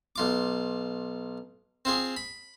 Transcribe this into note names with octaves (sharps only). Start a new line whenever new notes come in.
B1 F4 D6
C4 F4 G#4
B5